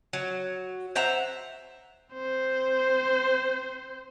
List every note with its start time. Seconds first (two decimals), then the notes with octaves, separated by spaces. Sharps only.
0.13 F#3
0.95 C5 E5 F#5 A#5
2.13 C4 C5